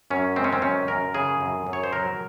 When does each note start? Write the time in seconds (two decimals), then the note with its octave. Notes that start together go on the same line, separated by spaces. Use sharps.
0.10 F#2 C#4
0.36 G#3 C4
0.44 C#4
0.53 C4
0.62 F#2 C#4
0.88 F#2 A#4
1.14 C#3 G#4
1.41 F#2
1.67 F#2
1.73 C#5
1.84 C5
1.93 F#3 A#4